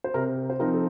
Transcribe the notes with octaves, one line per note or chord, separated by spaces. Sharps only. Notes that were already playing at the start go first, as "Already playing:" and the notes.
C5
C3 A#4
C5
F3 C4 D#4 A#4
A4